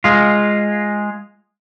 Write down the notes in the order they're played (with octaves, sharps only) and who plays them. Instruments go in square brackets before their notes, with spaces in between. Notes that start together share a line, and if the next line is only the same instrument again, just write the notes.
[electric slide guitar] G#3 F4